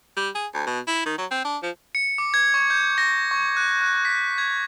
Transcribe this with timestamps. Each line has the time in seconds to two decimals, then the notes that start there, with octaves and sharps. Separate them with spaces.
0.16 G3
0.35 G#4
0.54 D2
0.67 B2
0.87 E4
1.06 D#3
1.18 F#3
1.31 C4
1.44 D4
1.62 F3
1.95 C#7
2.18 D6
2.34 G#6
2.54 C#6
2.70 G6
2.98 A#6
3.31 C#6
3.57 F#6
3.82 F#6
4.05 B6
4.38 G#6